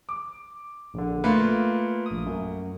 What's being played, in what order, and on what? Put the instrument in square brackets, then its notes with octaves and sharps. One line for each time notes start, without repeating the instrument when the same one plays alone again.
[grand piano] D6
[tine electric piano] A#1 D3
[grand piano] A3 A#3 [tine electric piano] F4 B4
[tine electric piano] A#1 D#6
F#2